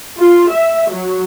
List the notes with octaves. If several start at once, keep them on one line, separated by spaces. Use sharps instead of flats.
F4
E5
F#3